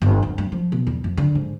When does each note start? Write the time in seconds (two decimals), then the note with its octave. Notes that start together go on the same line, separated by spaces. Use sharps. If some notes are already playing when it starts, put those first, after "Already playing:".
0.02 G1
0.22 F2
0.38 G2
0.52 F3
0.72 B2
0.87 E2
1.04 F2
1.17 D3
1.35 G#2